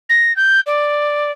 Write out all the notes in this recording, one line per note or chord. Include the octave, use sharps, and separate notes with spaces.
A#6
G6
D5